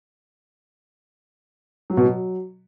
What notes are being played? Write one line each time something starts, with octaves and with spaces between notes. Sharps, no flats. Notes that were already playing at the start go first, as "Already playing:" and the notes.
F#3
B2
F#3